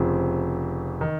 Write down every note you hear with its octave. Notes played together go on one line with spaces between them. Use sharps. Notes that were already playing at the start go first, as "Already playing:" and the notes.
Already playing: F1 F2 C#3 F3 C4
D#3